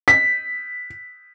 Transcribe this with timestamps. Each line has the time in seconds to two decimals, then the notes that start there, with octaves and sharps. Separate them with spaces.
0.08 B6